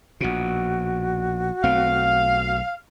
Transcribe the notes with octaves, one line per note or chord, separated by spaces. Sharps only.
A#1 B2 F#4
B1 A3 C4 F5